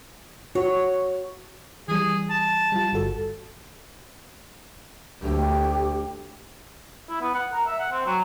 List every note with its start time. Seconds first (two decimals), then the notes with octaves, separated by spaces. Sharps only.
0.55 F#4 C#5
1.88 E3 G3 G#4
2.30 A5
2.72 G3 F4
2.93 G1 F#4 A4
5.23 D2 G4
7.09 E4
7.21 B3
7.34 F#5
7.53 A#4
7.67 E5
7.79 F#5
7.92 C4
8.06 F#3